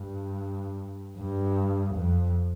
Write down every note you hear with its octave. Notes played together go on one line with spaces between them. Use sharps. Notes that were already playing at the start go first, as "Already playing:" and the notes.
Already playing: G2
G2
F2